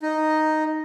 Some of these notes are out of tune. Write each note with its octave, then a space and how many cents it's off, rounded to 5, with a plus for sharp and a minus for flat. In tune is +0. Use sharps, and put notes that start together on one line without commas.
D#4 +0 D#5 +0